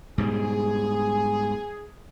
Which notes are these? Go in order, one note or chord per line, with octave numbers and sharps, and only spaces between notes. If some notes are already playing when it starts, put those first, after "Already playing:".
G#2 B2 G3 G#4